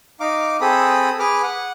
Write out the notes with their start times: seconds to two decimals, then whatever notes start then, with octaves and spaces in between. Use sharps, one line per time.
0.20 D#4 F5 D6
0.61 C4 G#4 A4 B5 D#6
1.19 G#4 B4 D6 F6
1.43 F#5